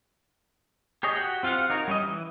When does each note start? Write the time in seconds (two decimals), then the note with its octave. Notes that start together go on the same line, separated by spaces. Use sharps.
1.03 G4 G#4 C#5 D#5
1.16 F#4 G4 F#5 G5
1.43 C4 F4 G4 F5 F#5
1.70 D#4 F#4 A#4 C#5
1.88 G3 C#4 D#5
2.01 E3